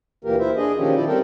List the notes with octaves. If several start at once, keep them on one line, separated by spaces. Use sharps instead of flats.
D2 A#2 E3 A#3 G4 A#4
E4 C5 E5
D4 G#4 D#5
A#2 D#3 F3 C#4 G4
D#3 E4 D5
G3 C4 G4 A4 A#4 G5